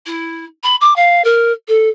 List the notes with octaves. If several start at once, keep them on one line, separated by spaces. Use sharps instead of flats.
E4
B5
D6
F5
A#4
A4